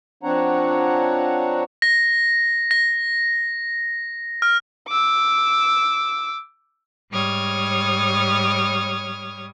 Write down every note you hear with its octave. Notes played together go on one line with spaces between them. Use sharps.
F3 C4 D4 C#5 F#5 A#5
A#6
A#6
F6
D6 E6
G#2 G3 C#5 D#6 F6 G#6